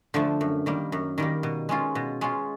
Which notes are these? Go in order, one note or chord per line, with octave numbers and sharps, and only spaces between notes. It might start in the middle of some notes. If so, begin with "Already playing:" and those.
D3 F3 A3
F#2
D#3 G3 A#3
F#2
D#3 G3 A#3
B2
G#3 C#4 F4
B2
G#3 C#4 F4